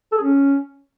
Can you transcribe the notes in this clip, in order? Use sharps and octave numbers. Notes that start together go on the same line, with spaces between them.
A4
G#4
C#4